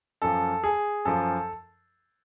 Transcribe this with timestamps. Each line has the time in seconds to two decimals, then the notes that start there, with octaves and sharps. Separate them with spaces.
0.22 F#2 F3 A4
0.64 G#4
1.05 F#2 F3 A4